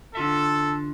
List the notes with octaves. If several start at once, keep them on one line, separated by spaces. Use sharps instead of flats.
D3 F4 A4 E5